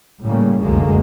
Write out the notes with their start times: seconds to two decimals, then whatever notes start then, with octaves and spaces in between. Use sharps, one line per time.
0.21 A2 C#3 G3 A#3
0.59 F1 C#2 F#2 D3 G#3 A#3